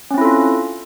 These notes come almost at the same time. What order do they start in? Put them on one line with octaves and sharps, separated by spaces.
C#4 C4 E4 A4 F4